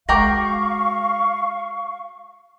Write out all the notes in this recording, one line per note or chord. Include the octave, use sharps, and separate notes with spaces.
G#3 F#4 A#4 F5 G5 C#6 D6 A#6